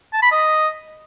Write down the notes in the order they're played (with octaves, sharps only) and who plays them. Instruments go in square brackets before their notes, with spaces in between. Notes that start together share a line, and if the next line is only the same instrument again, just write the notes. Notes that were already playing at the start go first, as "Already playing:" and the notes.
[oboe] A5
B5
D#5